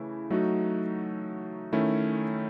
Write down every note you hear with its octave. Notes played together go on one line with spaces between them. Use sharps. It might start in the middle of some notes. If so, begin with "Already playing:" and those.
Already playing: C#3 E3 A3 E4
F#3 A3 D#4 F#4
D#3 A3 C#4 E4